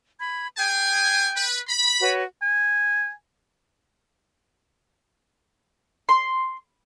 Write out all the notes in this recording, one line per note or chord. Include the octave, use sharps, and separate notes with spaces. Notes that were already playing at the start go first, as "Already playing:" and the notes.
B5 G#6
G#4 G5 G#5 G6
B4
B5
F#4 B4 C#5
G#5
C6